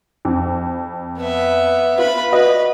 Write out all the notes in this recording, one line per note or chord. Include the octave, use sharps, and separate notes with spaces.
F2
B3 E5
B3 F4 B4 B5
F#4 B4 D#5